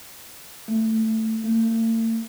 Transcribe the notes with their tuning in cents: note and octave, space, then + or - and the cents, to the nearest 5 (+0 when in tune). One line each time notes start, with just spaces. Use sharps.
A3 +10
A3 +45